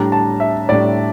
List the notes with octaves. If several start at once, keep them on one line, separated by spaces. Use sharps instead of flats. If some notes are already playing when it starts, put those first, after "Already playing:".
Already playing: A2 G3 D4 A#5
A5
E5
A2 G3 D4 D5